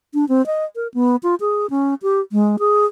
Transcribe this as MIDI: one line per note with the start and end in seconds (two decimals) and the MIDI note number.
0.14 0.28 62
0.29 0.45 60
0.46 0.65 75
0.76 0.87 70
0.94 1.16 59
1.23 1.35 65
1.40 1.66 68
1.70 1.94 61
2.02 2.20 67
2.32 2.56 56
2.59 2.86 68